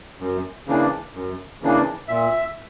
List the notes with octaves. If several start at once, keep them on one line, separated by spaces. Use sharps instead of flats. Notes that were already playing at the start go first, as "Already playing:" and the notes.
F#2
C#3 E3 A#3 D4
F#2
C#3 E3 A#3 D4
A#2 E5